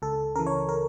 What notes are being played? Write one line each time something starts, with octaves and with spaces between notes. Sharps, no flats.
C#2 A4
C#3 E3 A#4
C#5
A#4